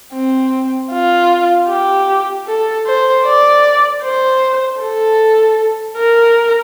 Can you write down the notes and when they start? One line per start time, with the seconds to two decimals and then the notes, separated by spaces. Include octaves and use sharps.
0.14 C4
0.92 F4
1.69 G4
2.47 A4
2.87 C5
3.26 D5
4.03 C5
4.80 A4
5.97 A#4